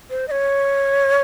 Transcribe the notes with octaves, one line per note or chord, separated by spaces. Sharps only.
C5
D#5
C#5